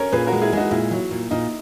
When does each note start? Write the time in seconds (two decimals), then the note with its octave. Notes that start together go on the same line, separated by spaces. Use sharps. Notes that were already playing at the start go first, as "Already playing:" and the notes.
Already playing: C#4 A#4 C#5
0.12 A#2 G#4 B4
0.27 F#4 A#4
0.32 G#3
0.42 E4 G#4
0.52 G#3 D#4 F#4
0.71 A#2 E4
0.91 F#3
1.11 A#2
1.31 A#2 D#4